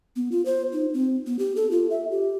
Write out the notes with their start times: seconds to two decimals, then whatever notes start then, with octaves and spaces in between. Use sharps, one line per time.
0.16 B3
0.32 F4
0.45 C5
0.73 D#4
0.94 C4
1.26 B3
1.39 G4
1.56 A4
1.71 F4
1.90 E5
2.11 G4